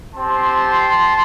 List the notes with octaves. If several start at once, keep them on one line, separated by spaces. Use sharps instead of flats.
C4 G4 A5 C6